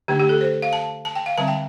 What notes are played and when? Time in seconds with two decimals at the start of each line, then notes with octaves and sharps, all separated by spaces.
0.08 D3 A3 D4 G4
0.20 G4
0.29 A4
0.41 C5
0.62 F5
0.73 A5
1.05 A5
1.15 G5
1.26 F5
1.37 D3 G3 C4 A5
1.48 G5